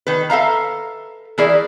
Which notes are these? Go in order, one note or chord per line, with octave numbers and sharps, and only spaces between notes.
D#3 B4
A4 E5 F5 A#5
E3 E4 G#4 A#4 D5